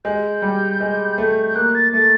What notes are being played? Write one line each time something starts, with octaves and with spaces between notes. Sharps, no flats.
G#3 G6
G3
G#3
A3
G6
A#3 F#6
A6
A3 A6